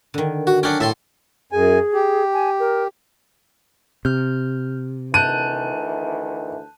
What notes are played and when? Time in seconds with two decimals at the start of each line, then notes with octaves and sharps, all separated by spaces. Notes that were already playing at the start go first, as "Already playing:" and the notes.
0.14 D3 D#3
0.47 F#4
0.63 F#3 C#4 D4 F#5 G5
0.80 A2 A4 E5 C6
1.52 F#2 G#4 G#5
1.94 G4
2.33 G#5
2.60 A#4
4.05 C3 F6 G6
5.14 D2 D#3 E3 A5 F#6 G6 D#7